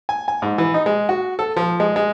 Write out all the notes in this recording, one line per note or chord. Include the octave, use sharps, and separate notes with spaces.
G#5
G#5
G#2
E3
D#4
G#3
F#4
A4
F3
G#3
G#3